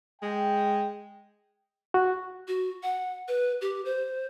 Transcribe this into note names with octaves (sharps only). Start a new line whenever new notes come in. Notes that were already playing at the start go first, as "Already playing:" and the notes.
G#3 G5
F#4
F#4
F#5
B4
G4
C5